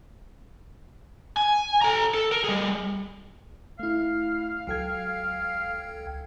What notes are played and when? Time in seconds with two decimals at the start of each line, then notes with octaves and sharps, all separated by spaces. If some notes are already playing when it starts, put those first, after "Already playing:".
1.37 G#5
1.82 A4 A#5
2.14 A4
2.32 A#4
2.44 G3 G#4
3.79 A3 E4 F5
4.67 C#2 F#3 A4 G5 G#6